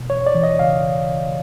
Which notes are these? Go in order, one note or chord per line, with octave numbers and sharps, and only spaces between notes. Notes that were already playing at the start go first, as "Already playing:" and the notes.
Already playing: B2
E2 C#5
D5
E3
D#5
C#3 F5